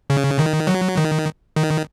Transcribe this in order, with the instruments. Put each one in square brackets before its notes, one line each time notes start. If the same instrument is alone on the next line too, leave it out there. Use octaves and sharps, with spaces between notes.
[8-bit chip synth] C#3
D#3
F#3
D#3
D#3